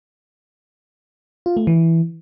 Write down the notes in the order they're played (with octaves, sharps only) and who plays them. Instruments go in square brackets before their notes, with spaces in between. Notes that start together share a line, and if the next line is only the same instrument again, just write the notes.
[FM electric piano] F4
A3
E3